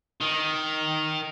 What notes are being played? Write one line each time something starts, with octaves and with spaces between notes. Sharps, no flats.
D#3